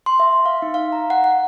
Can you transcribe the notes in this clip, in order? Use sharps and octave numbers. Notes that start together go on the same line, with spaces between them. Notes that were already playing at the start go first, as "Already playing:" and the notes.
C6
E5
F5
D#4
F5
A#5
F#5
F#5